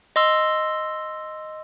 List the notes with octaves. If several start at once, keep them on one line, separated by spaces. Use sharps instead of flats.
D#5 C6 E6